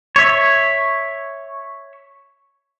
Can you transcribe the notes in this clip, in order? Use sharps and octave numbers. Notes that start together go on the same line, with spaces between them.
C#5 E5